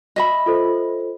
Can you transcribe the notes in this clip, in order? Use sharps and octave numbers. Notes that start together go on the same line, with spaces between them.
D#5 E5 B5
F4 A4 C5